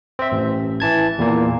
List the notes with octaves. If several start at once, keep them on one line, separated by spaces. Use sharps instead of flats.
C4 E5
A1
E3 A5 G#6
E2 A#2 A#3